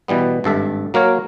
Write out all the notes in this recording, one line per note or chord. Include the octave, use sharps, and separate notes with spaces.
B2 E3 G3 B3
G#1 G2 A4 E5
F#3 A#3 A#4 C#5